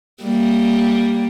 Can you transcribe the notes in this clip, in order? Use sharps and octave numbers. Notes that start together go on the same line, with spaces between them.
G3 A#3